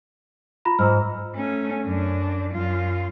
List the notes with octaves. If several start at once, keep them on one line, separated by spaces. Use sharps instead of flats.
F4 A#5 B5
G#2 A#5 E6 F6
A3 C#4
F#2 D4
F#2 F4